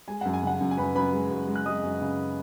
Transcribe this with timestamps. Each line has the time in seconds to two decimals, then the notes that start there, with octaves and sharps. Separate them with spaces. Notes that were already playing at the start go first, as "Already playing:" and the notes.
0.08 G#3 G#5
0.21 F#5
0.25 F#2
0.34 G#5
0.43 C#3 F#5
0.61 F#2
0.71 G#5
0.77 F#2 B4 B5
0.95 F#2 B4 B5
1.13 G#3
1.31 F#2
1.47 G#3
1.55 F#6
1.65 G#3 D#5 D#6
1.83 F#2
2.01 C#3